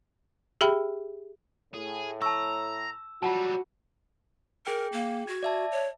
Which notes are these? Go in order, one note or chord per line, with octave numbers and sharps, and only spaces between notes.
G4 G#4 E5 G5 B5
A2 G#4
A5 A#5 C#6 E6
F#3 G3 F4 F#4 F#5 A5
G#4 A#4 G5
A#3
F#4 G#6
D5 E5 A5
C#5